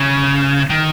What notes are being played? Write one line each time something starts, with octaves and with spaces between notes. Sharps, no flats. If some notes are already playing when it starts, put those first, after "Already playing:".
Already playing: C#3
D#3